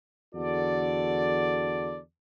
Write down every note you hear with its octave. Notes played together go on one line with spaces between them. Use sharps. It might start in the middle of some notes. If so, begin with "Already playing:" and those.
E2 D3 F#4 A4 D5